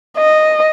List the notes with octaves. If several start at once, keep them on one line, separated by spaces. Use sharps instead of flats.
D#5